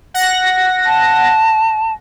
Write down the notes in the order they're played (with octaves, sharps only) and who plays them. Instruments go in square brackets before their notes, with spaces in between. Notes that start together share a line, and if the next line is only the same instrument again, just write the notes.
[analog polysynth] F#5 A#6
[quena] A5